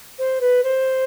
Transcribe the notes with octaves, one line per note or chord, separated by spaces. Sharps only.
C5
B4
C5